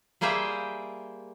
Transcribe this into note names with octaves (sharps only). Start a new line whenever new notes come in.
G3 A#3 G#4 C5 E5 G5